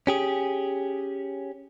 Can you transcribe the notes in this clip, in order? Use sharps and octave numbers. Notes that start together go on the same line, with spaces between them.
C#4 G4 G#4